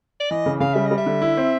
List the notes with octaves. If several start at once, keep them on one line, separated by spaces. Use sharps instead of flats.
D5
E3 D#5
C#3
C#3 F5
G3 E5
D#5
G3
E5
D3
E4
C4